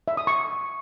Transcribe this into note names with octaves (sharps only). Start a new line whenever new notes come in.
E5
D#6
C#6